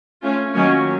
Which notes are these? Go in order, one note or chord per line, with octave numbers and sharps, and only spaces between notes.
A3 C#4 F4
D#3 F#3 A#3 C#4